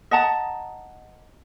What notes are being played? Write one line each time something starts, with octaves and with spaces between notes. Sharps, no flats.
D#5 F#5 A5 A#5